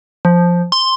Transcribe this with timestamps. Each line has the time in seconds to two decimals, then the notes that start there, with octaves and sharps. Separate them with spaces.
0.25 F3
0.72 C6